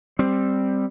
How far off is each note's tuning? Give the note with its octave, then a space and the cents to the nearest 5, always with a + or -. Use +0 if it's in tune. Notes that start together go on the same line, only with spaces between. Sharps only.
G3 +10 C4 +0